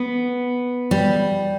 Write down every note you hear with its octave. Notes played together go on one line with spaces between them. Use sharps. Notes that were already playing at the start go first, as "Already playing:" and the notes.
Already playing: B3
G3